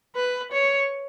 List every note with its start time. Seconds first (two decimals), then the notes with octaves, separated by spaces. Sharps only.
0.16 B4
0.52 C#5